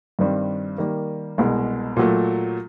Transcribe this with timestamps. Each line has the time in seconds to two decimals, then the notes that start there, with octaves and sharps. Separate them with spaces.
0.19 G2 D#3 G3 C4
0.78 D#3 G3 A#3
1.38 C2 B2 G#3
1.97 A#2 F#3 A3